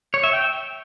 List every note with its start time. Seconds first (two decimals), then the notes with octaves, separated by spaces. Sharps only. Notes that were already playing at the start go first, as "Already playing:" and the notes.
0.14 C#5
0.24 E5
0.33 G5